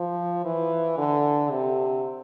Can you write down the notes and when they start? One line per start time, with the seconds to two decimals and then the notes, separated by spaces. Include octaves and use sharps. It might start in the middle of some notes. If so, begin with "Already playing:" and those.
Already playing: F3
0.45 E3
0.98 D3
1.50 C3